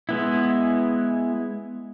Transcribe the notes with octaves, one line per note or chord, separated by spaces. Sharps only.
G#3 B3 E4